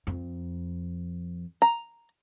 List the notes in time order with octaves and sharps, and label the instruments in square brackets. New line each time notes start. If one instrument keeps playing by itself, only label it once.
[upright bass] F2
[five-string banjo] A#5